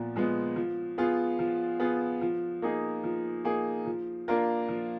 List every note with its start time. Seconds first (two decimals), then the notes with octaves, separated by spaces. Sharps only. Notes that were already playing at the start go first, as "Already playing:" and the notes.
Already playing: A#2 F3 B3
0.16 F3 G#3 B3
0.56 F3
0.98 B3 F4 G#4
1.39 F3
1.80 B3 F4 G#4
2.21 F3
2.62 A#3 D#4 G#4
3.04 F3
3.45 A#3 D#4 G#4
3.86 F3
4.28 A#3 D4 F4 A#4
4.68 F3